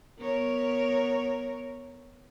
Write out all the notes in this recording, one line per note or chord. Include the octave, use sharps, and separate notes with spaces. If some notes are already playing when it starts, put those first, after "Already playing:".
B3 A#4 C#5